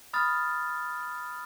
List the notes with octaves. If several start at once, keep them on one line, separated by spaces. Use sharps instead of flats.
B5 D#6 F6 A6